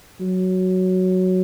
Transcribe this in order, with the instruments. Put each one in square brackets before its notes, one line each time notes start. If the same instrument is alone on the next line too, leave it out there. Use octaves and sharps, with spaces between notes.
[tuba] F#3